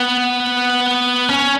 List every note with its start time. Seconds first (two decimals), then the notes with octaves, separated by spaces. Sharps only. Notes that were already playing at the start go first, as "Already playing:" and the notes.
Already playing: B3
1.29 C#4